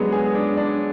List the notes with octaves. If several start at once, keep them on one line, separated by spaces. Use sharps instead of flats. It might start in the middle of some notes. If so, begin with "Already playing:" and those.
Already playing: F#3 G#3 B3 D4
G#4
D4
D4